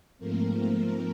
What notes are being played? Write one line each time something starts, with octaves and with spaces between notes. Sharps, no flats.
G#2 F3 A3 A#3 C4 A#4